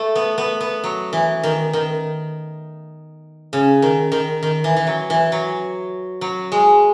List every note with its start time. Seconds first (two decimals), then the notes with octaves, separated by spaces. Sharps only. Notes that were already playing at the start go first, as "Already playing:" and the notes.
Already playing: A3
0.15 B3
0.38 B3
0.61 B3
0.84 F#3
1.13 E3
1.43 D#3
1.73 D#3
3.53 C#3
3.82 D#3
4.12 D#3
4.43 D#3
4.64 E3
4.77 E3
4.87 F#3
5.10 E3
5.32 F#3
6.21 F#3
6.52 G#3